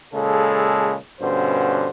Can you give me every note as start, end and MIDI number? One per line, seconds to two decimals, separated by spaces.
0.14 0.96 46
0.14 0.96 49
0.14 0.96 56
0.14 0.96 69
1.21 1.90 43
1.21 1.90 47
1.21 1.90 50
1.21 1.90 61
1.21 1.90 72